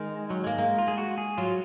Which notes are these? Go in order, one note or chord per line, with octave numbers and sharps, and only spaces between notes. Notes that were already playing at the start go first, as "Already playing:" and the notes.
Already playing: D#3 G#3
F#3
G#3 A#3
G#3 A#3
F4
G#4
F#4
G#4
F#3 F4